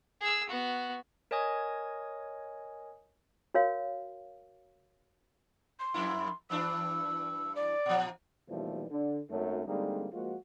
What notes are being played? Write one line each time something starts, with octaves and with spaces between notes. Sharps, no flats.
G#4 E6
B3 F#4
A#4 C#5 D#5 G#5 D#6 G#6
F#4 A#4 C#5 F5
C6
F2 A#3 E4
G2 E3 D4 E6
D5
A#2 F3
D#2 B2 E3 F3 G3 A3
D3
G#1 F#2 A3
D3 G3 G#3 A#3 C4 D#4
F3 G#3 A#3 F4 F#4